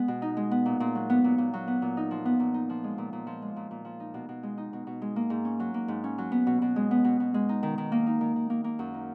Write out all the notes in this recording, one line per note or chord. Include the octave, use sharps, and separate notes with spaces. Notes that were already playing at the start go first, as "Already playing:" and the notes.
Already playing: G#3 B3
B2
D#4
G#3
B3
A#2
A#2
F#3
B3
A#2
A#2
F#3
B3
A#2
D#4
F3
B3
A#2
D#4
F3
G#3
A#2
A#2
F3
G#3
A#2
A#2
F3
D#4
B2
B2
G#3
D#4
B2
B2
G#3
A#3
G#2
C#4
F#3
A#3
G#2
C#4
F#3
B3
B2
B2
G#3
B3
B2
B2
G#3
D#4
D#3
D#3
A#3
D#4
D#3
D#3
A#3
A#3
F#2
D#4